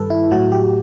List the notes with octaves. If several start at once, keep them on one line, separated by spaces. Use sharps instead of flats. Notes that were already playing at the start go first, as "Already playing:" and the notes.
Already playing: G2 D#3 G3 A4 B4
E4
A2 F#3 F#4
G4